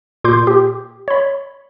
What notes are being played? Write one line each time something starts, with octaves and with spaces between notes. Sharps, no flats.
A#2 C6 D6 G6
G4
C#5 B5